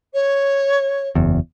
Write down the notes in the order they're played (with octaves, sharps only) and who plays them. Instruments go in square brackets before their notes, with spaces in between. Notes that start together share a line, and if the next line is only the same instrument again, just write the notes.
[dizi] C#5
[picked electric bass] F#1 E2